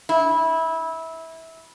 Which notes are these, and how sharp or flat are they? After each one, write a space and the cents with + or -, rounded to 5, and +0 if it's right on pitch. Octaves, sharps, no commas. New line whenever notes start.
E4 -20